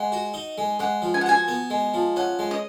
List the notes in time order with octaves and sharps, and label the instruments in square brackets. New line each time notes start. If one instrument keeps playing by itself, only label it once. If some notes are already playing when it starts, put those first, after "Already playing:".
Already playing: [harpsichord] G#3 [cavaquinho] F#5
[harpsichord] F#4
D#4
G#3
[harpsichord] G#3 [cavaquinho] F#5
[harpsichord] F3
[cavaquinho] G#5
F#5
[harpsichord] F#4 [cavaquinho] G#5
[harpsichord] B3
G#3
F3
[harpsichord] C#4 [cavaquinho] F#5
[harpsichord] G#3
[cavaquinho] D#5